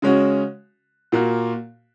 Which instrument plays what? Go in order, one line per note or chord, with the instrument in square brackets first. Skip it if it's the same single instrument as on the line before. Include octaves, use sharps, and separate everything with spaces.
[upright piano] C#3 G#3 C#4 F#4
A#2 A#3 F#4